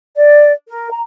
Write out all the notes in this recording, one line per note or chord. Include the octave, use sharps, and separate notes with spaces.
D5
A#4
A#5